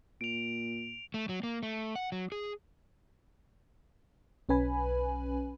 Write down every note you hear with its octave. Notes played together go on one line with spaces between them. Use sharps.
A#2 D7 F7
A3
F#3
A#3
A3
F#5
F#3
G#4
B1 C#4 B4 G#5 B5